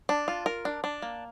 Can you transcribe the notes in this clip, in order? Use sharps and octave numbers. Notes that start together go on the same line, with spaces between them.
D4
F4
A#4
D4
D4
A#3